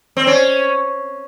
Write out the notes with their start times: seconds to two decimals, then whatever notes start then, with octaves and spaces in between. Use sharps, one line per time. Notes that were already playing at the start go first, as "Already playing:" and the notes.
0.17 C4
0.27 C#4